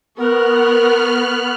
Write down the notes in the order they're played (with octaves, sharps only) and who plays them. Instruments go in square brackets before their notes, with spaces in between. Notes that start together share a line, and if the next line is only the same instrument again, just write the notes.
[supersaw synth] B3 F6 F#6 [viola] A#4 C#6